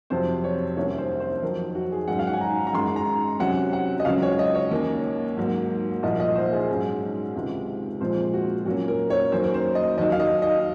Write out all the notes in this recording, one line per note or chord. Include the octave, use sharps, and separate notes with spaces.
F2 C3 F#3 C4 C5
C#5
C2 C3 D#3 A#3 C#4 C#5
C5
C5
F2 D#3 F#3 A#4
F#4
G#4
G#2 D#3 F#3 C#4 F#5
F5
F#5
G#5
A#5
A#5
F#2 D#3 G#3 C6
A#5
C3 F#3 C#4 F#5
F#5
D#5
C#2 C#3 F#3 C#4 F5
C#5
D#5
C#5
D#2 D#3 A#3 C#4
G#2 F#3 A#3
C2 A#2 F3 A#3 D#5
D#5
C5
G#4
G#2 F#3 C#4
C#2 C3 D#3 G#3
A#2 F3 G#3 C4 C5
F#4
A#2 F#3 A#3 C#4 F#4
A#4
C#5
F#2 D#3 F#3 A#3 C#4 C5
A#4
C5
D#5
D#2 D#3 F#3 D#5
F5
D#5
D#5